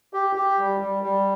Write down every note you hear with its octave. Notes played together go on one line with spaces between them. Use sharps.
G4
G4
G3
G3
G3